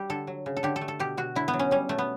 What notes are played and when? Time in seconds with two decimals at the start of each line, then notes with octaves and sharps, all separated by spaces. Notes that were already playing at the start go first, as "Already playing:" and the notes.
Already playing: G3 G4
0.10 D3 A4
0.27 F#3
0.46 C#3
0.57 A4
0.63 D3 G4
0.76 A4
0.81 A3
0.88 A4
1.00 B2 G4
1.17 B2 F#4
1.36 D3 E4
1.48 B3
1.54 F#3
1.59 C#4
1.71 G3 C#4
1.89 B2 A3
1.98 B3